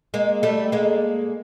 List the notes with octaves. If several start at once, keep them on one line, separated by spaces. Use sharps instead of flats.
G#3 A#3
G3 A3
G#3 A#3